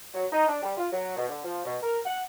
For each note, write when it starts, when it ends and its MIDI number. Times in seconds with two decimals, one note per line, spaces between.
0.14 0.26 54
0.32 0.47 63
0.48 0.61 62
0.63 0.73 55
0.77 0.87 65
0.93 1.13 54
1.16 1.27 47
1.29 1.40 50
1.44 1.65 53
1.65 1.77 47
1.82 1.99 70
2.05 2.21 78